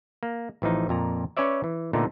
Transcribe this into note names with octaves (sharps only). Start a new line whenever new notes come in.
A#3
A1 E3 F3 D#4
F2 A#2 A#5
C#4 B4 C#5 D5 E5
E3
A#2 D3 A3 B3 D#4